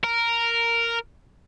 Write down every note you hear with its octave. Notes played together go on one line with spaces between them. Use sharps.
A#4